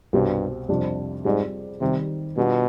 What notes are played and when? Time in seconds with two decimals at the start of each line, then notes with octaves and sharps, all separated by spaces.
0.13 C2 G2 B2 G3 C4 G4
0.69 F2 C3 G3 D4
1.25 G#2 G3 C4 F4 G#4 D5
1.81 C3 D#3 G3 C4
2.37 B2 G3 B3 D4 F4